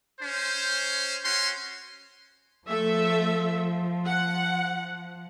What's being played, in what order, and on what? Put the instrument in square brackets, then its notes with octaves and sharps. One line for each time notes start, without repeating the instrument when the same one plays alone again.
[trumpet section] C#4 C5
C#4 F#4 C6
[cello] F3 [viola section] A3 A4 E5
[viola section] F#5